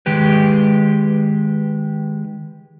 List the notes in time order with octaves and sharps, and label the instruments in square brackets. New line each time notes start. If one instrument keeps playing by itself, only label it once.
[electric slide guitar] D#3 G#3 G4 B4